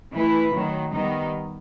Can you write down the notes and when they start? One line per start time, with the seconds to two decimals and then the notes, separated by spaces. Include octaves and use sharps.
0.13 E3 A3 E4 B4
0.52 D#3 F#3 A3
0.92 D#3 G3 B3 D#4